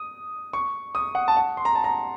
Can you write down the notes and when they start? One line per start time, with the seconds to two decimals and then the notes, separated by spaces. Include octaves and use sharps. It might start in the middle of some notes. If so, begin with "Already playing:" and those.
Already playing: D#6
0.53 C#6
0.95 D#6
1.15 F#5
1.28 A5
1.37 F#5
1.57 C6
1.65 A#5
1.75 A5
1.84 A#5